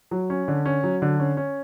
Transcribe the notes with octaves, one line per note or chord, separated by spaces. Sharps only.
F#3
C#4
D3
C#4
F#3
D3
C#4
C#4